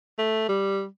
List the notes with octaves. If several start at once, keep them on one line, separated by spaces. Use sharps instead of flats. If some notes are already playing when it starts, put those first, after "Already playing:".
A3
G3